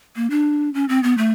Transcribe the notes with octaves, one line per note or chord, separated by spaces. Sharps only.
A#3
D4
C#4
C4
B3
A3